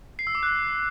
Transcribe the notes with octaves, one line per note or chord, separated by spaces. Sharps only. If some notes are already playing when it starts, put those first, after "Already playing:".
C7
E6
D6
F#6